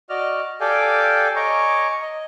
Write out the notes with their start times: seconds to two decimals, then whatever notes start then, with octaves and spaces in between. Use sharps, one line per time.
0.10 F#4 D5 D#5 F6
0.60 G4 A4 D5 F5 G5 G#5
1.36 C#5 D#5 G#5 A#5 C#6 D6
2.02 D#5